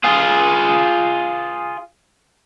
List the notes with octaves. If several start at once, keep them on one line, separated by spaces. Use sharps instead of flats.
F4 G#4